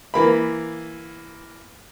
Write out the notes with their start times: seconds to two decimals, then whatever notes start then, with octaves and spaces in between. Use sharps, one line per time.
0.14 E3 A#3 B5